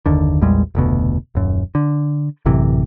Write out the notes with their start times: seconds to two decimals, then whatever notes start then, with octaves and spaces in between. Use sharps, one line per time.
0.06 F#1 D#2 D3
0.41 A#1 E2 G3 G#3
0.75 F1 D2 B2
1.35 D#1 F#2
1.75 D3
2.46 A1 F#2 C3 E3